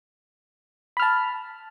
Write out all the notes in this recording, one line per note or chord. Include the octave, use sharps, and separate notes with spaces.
A5 B5 F6